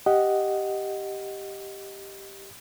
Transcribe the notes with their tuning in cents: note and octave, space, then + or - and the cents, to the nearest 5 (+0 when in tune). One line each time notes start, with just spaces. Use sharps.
G4 +0 D#5 +0 F#5 +0